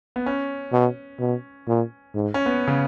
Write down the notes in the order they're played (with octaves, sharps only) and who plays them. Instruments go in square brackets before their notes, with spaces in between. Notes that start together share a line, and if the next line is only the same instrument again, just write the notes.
[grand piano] B3
C#4
[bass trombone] B2
B2
A#2
G#2
[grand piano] C#4
B3
C#3